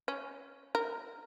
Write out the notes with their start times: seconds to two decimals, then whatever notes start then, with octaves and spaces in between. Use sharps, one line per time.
0.08 C#4
0.75 A#4